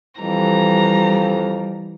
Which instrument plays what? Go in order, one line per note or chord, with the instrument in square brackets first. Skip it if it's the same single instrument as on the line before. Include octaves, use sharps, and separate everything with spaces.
[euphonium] F2 [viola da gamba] E3 [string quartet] G3 [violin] A#5